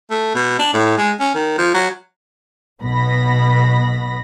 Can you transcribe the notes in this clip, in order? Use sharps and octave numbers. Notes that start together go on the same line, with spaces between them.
A3
B2
D4
A2
G#3
C#4
D#3
F3
F#3
B1 B2 B3 B5 A#6